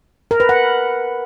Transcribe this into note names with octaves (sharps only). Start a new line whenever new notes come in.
A#4
B4
F#5